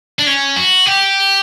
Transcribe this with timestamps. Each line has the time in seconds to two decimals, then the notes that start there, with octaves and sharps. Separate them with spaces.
0.19 D4
0.26 C#4
0.56 F#4
0.86 G4